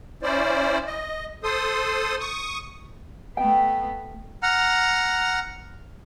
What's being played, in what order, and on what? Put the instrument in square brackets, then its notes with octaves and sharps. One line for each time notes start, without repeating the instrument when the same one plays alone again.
[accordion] C#4 E4 C5 D5
D#5
A4 C5 C6 D#6
C#6 D#6
[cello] A3 B3 [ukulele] G5
[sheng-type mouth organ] F#5 A#5 F6